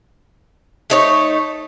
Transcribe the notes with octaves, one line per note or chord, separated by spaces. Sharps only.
A3 D#4 C#5